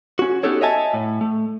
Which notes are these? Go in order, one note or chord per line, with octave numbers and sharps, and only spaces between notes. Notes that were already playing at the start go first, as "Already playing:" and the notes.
C#4 F#4
B3 D#4 F#4 G4 A4 C#5
C#5 D#5 E5 G#5 A5
A2
A3